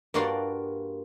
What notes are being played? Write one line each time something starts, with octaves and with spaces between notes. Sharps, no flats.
G2 A#3 F4 F#4 D5 C6